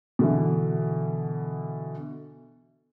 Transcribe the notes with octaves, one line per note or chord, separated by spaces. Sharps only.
B2 D3 E3